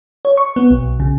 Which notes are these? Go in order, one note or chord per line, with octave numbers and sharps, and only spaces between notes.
C#5
C#6
B3
B1
C#3